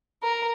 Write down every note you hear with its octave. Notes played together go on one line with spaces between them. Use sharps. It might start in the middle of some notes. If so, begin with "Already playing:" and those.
A#4